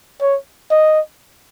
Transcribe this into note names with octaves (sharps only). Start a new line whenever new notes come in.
C#5
D#5